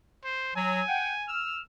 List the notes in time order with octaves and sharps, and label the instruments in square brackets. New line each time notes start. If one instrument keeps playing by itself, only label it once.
[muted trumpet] C5
[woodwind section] F#3 [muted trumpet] G#5
[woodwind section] F#5 G5
E6 F6